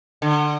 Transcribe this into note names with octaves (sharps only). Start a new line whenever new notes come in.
D3